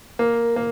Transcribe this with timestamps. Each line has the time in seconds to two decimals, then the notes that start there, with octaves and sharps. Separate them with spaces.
0.19 A#3
0.56 A#3